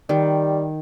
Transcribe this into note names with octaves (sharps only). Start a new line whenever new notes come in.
D#3 G3